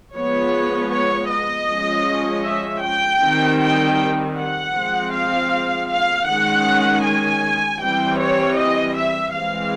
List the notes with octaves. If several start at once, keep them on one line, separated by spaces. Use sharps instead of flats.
F3 G#3 B3 C#5
C#5
D#5
F3 G#3 C#4
E5
G5
D#3 G3 C4
G5
F#5
F3 G#3 C4
F5
F5
D#3 G#3 C#4 F#5
G#5
E3 G3 C4 G5
C#5
D#5
E5
E3 G#3 C4 F5